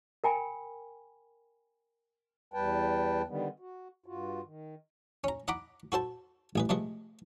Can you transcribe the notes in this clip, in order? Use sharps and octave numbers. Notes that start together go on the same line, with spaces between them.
A#4 G5 G#5 B5
E2 G3 B4 G5 A5
D3 D#3 G3 B3
F#4
G2 F4 F#4
D#3
C#4 A#5
D#5 F#5 A#5 B5 D6
F#4 A4 C5 A5
A1 G#4 B4
C3 F3 G#3 A3 B4 D#5